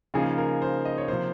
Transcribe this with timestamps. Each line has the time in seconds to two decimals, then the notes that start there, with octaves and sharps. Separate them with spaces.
0.14 C#3 F3 A#3 D#4 G#4
0.38 A#4
0.62 C5
0.85 D#5
0.98 C#5
1.08 C3 F3 A#3 C5